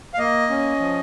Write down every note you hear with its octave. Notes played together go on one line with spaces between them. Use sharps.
F5
A#3 D#5
C#4
F3